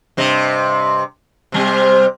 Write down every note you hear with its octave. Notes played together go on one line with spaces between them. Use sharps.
G2 C3 D#5
C3 G3 C4